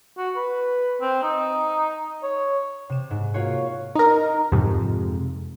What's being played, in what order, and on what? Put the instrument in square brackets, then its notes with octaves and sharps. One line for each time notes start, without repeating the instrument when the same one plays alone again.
[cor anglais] F#4
B4
C4
D#4
C#5
[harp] C3 E7
G#2
A#3 F4 F#4 C#5
[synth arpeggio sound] D#4 A#4
F2 G#2 C3